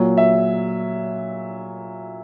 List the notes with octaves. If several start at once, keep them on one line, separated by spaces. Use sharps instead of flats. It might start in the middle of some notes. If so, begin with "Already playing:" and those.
Already playing: A#2 F#3
E5